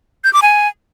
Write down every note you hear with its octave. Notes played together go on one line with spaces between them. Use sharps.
G6
D6
G#5